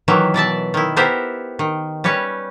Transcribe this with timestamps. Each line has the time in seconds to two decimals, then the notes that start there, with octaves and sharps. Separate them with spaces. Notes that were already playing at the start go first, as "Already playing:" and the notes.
0.08 D#3 E3 F#3 E5
0.34 B2 D5 E5 A5
0.74 D#3 E4
0.96 B3 G4 A#4 C5 E5
1.59 D#3
2.04 G3 C#4 B4 C#5